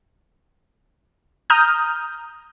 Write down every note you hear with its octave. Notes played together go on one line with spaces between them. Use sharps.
A#5 D#6 F6 G6